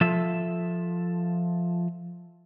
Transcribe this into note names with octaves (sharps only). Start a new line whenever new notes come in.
F3 F4 A4 E5